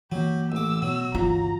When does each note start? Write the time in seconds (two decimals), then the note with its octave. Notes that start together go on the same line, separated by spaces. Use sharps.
0.12 E3 F#3 A#3 G4
0.52 A1 D6 E6
0.82 B2 F#3
1.15 G1 C#2 E3 F4 A#5